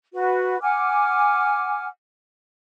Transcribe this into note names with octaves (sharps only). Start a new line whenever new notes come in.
F#4 B4
F#5 G#5 D6 F6